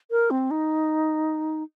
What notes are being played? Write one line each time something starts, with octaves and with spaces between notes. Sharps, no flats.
A#4
C4
D#4